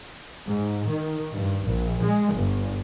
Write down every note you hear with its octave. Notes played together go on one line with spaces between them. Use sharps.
G#2
D#3
G2
A#1
G#3
G1